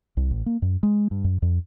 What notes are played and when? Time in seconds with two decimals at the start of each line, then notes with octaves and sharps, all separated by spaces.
0.17 C2
0.31 A1
0.46 A#3
0.62 F#2
0.83 G#3
1.11 G2
1.24 F#2
1.42 F2